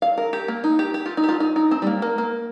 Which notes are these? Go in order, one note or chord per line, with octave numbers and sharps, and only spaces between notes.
F5
A#4
G4
A#3
D#4
G4
G4
F4
D#4
G4
F4
D#4
D#4
C4
G3
A#3
A#3
A#3